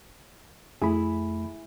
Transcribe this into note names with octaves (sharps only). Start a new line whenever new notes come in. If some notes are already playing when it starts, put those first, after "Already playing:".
F2 A3 E4 G#4 B5